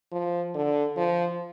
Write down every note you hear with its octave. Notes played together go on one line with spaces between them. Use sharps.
F3
D3
F3